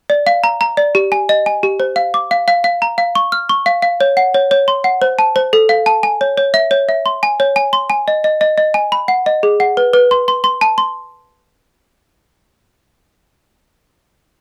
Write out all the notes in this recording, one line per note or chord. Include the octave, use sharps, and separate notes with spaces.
D5
F5
A#5
A#5
D5
G4
G#5
D#5
G#5
G4
C5
F5
D6
F5
F5
F5
A#5
F5
C#6
F6
C#6
F5
F5
C#5
F#5
C#5
C#5
C6
F#5
C5
A5
C5
A4
F5
A5
G#5
C#5
C#5
E5
C#5
E5
C6
G#5
C#5
G#5
C6
G#5
D#5
D#5
D#5
D#5
G#5
B5
F#5
D#5
G#4
F#5
B4
B4
C6
C6
C6
A5
C6